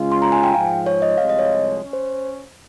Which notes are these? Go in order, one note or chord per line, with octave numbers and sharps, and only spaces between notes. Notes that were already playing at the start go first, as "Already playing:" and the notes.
Already playing: C#3 G#3 C#4 F4
C6
A#5
G#5
G5
G#2 F3 G#3 F5
C#5
D#5
C2 C3 F3 G#3 F5
D#5
C#5
C#4
C5